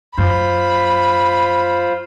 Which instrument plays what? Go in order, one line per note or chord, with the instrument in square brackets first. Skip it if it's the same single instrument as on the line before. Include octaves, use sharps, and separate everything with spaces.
[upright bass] F#2 [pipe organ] F4 C5 [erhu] B5